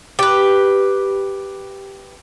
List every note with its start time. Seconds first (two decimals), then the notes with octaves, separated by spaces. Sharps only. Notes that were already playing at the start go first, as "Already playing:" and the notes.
0.19 G4 B4